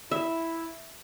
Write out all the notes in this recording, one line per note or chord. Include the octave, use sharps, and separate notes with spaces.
E4 E5